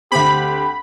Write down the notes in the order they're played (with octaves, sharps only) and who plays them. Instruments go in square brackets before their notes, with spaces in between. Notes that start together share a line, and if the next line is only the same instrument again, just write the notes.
[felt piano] D2 C4 [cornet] G4 [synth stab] B5